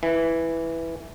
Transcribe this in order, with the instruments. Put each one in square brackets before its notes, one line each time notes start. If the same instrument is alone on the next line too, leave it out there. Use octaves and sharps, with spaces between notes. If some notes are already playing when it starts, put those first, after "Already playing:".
[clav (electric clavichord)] E3